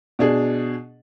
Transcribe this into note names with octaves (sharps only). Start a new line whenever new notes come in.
B2 D4 G#4